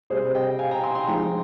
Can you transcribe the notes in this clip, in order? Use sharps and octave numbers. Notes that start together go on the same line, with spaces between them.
C3 G3 C4 G#4 C5
D#5 G5
F5 G#5
G5 A#5
G#5 C6
G#5 C6
F3 G#3 D#4 G5 A#5